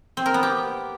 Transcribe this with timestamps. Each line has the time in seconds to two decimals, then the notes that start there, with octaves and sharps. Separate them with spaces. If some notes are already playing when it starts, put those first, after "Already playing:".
0.17 C4
0.26 A#4
0.34 B3
0.43 G4